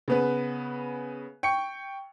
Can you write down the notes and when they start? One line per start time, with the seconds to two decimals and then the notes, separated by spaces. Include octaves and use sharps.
0.08 C#3 B3 B4
1.43 G5 C#6 C#7